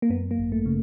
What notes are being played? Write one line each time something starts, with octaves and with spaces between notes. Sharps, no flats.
A#3
F#2 B3
A#3
G#1
A3
C#3